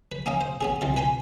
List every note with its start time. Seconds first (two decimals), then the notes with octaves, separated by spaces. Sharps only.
0.12 B4
0.26 A#3 C#4 D#5 F5
0.41 C5
0.61 B3 C#4 G#4
0.81 C2 E3 F4
0.97 B4 G#5 A#5 C6